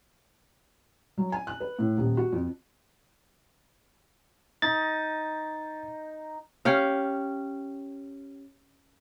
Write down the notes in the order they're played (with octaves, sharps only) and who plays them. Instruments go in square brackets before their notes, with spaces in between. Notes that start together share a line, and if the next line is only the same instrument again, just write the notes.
[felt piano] F#3
G#5
F#6
B4
A2
D#1
F#4
F2
[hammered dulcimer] D#4 [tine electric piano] A6
[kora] C#4 G4 F5